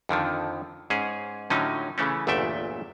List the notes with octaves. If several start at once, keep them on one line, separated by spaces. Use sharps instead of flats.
F2 D3 D#3 F3
G#2 C#4 G#4
A2 D3 F3 F#3 C#4 D#4
C#3 E3 A3 C#4
G1 E2 A#2 A3 E5 G5